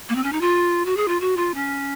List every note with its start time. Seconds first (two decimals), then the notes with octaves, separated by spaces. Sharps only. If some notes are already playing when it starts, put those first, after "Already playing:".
0.09 A#3
0.15 C4
0.24 C#4
0.32 D#4
0.41 F4
0.85 F#4
0.97 G#4
1.08 F4
1.20 F#4
1.37 F4
1.54 C#4